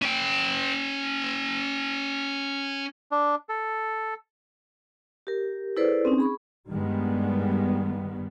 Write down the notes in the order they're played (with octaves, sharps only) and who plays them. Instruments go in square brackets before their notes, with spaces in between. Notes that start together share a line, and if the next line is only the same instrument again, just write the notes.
[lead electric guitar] C#4 G5
[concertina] D4
A4
[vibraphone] G4 A#4
E4 G#4 A4 B4 C5 D5
C4 C#4 D#4
G#4 B5 C#6
[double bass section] G2 D#3 G3 G#3 B3